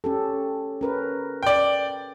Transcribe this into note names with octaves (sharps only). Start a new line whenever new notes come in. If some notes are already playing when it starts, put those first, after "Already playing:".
C#4 G4 A4
C#4 A#4 B4
D5 G5